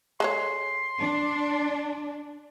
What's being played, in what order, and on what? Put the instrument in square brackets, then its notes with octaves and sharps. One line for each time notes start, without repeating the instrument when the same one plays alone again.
[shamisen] G#3 A4 C#5 [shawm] C6
[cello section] D4